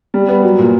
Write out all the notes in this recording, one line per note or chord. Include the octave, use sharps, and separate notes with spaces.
G3
B3
F#3
A#2